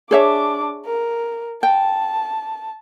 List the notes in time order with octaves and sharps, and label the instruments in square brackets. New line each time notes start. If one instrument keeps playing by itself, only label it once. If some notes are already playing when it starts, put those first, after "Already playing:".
[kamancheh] D4 D6 [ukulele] G#4 C#5 E5
[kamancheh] A#4
[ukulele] G5 [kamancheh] A5